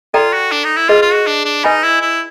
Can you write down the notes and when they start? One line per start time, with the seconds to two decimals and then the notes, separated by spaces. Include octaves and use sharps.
0.14 F4 A4 D5 G5 A#5
0.33 F#4
0.52 D4
0.64 D#4
0.76 E4
0.88 F4 G#4 B4 D#5
1.02 F4
1.14 F#4
1.27 D4
1.45 D4
1.64 D#4 B4 D#5 G#5 B5
1.83 E4
2.01 E4